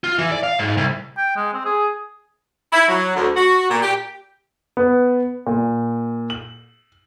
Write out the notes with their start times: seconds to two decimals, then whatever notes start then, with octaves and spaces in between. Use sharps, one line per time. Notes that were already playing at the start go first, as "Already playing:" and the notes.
0.04 F4
0.18 E3
0.32 D5
0.43 F5
0.59 G#2
0.77 C2
1.17 G5
1.36 G#3
1.54 C4
1.65 G#4
2.73 E4
2.88 F#3
3.16 D2
3.36 F#4
3.70 A#2
3.83 G4
4.77 B3
5.47 A#2
6.30 F#7